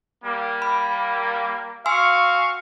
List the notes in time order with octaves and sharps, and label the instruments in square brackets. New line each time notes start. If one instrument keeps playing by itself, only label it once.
[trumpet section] G3 A#3
[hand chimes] B5
[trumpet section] F#4 C#6 [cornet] F5 [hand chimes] G#5 C6 E6